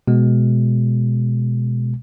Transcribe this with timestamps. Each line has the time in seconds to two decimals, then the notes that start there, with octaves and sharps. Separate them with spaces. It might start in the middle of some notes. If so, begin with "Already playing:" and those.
0.08 B2 G#3